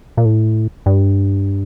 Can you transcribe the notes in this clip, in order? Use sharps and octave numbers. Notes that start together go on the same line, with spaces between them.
A#2
A2
G2